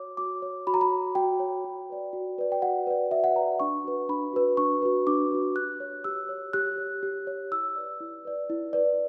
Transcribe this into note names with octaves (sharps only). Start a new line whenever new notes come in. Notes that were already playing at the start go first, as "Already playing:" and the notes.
Already playing: F#4 C#5 D6
F#4 D6
C#5
F#4 B5
A#5
B5
C#5
F#4 G5
C#5
F#4
B4 D5
F#4
B4 D5
G5
F#4 F#5
B4 D5
F#4 E5
F#5
B4 D5 A#5
D4 C#6
F#4 B4
D4 B5
F#4 B4
D4 C#6
F#4 B4
D4 D6
F#4 B4
G4 F#6
C#5
G4 E6
C#5
G4 F#6
C#5
G4
C#5
E4 E6
B4 D5
E4
B4 D5
E4
B4 D5